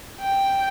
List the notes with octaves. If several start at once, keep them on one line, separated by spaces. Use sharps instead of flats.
G5